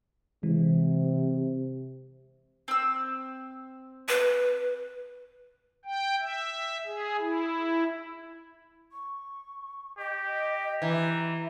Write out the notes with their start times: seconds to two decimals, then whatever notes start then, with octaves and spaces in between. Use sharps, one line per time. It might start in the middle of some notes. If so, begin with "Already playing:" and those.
0.43 C3 E3 G#3
2.68 C4 E6
4.09 B4
5.85 G5
6.20 E5
6.86 G#4
7.19 E4
8.92 C#6
9.98 G4 D#5
10.82 E3 A#5